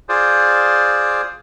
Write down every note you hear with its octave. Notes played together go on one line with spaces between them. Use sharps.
F4 G#4 C5 D5